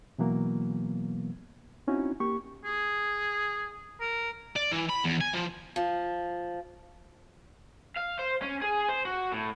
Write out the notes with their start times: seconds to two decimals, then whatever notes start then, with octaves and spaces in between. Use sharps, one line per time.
0.18 B2 E3 F#3 A#3 B3
1.87 C4 C#4 D#4 E4 F#4
2.20 A#3 G4 C#6
2.65 G#4
4.01 A#4
4.56 D5
4.71 E3
4.89 B5
5.04 E2
5.21 G#5
5.34 F3
5.76 F3
7.97 F5
8.19 C5
8.42 C#4
8.61 G#4
8.89 C5
9.05 F#4
9.32 A2